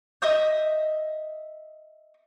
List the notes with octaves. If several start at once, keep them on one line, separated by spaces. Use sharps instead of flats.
D#5 E5 D#6 G6